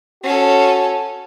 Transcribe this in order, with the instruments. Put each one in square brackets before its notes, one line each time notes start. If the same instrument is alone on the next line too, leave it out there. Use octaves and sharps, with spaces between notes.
[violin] C#4 A4 [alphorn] F#4